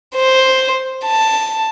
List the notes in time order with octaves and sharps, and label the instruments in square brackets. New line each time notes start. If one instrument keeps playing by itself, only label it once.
[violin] C5
A5